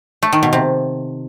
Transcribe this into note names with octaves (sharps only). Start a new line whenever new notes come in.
A3
D#3
B2
C3